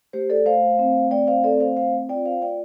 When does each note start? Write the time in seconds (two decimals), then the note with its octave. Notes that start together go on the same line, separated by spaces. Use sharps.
0.13 A3 G4 C5
0.30 A4 D5
0.46 A3 C5 F5
0.79 C4
1.11 A3 D5 G5
1.27 C5 F5
1.44 C4 A4 D5
1.60 C5 F5
1.76 C4 C5 F5
2.09 F4 D5 G5
2.26 C5 F5
2.42 A3 D5 G5